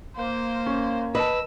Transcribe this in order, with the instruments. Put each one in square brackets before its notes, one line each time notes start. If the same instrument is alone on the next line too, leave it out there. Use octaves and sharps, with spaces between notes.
[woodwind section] A#3 [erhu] C5
[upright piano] C#4
[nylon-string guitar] B4 [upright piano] D#5 A5 [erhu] E6